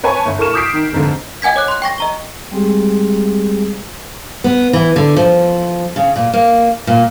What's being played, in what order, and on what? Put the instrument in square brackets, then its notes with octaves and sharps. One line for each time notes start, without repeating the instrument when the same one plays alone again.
[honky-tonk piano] B4 C#5 G#5 A5 C#6
G1
A2 A4 A#4 C#6 F6 E7
D6 D#6 G6 B6 C7 D7
D#3
F1 G#2 D3
[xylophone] D#5 F#5 G#5 G#6 B6
C#5 D6 F#6
C6 F#6
G5 C#6 A#6
D#5 A#5 G7
[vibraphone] G3 G#3 C4 G4 G#4
[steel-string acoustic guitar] B3
E3
D3
F3
C#3
A#2
A#3
A#2